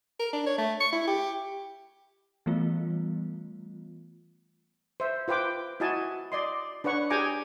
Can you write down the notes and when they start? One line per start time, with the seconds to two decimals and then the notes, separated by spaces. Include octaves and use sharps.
0.19 A#4
0.33 D4
0.46 C#5
0.58 A3
0.81 C#6
0.92 E4
1.07 G4
2.46 E3 G3 A3 B3 F4
5.00 C5 E5
5.28 F4 B4 C5 G5 D6
5.80 E4 F#4 D#5 G#5 A5
6.32 D5 D#5 C6
6.84 D4 B4 C#5 F#5 C#6
7.10 G4 G#4 G5 G#5 A#5 D6